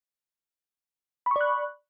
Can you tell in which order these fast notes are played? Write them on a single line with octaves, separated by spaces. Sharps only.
B5 C#6 D5 F#6